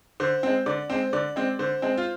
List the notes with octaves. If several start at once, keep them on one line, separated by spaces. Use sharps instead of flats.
D3 C5
G#3 C4
D3 D5
G#3 C4 C5
D3 D5
G#3 C4
D3 C5
G#3 C4
F4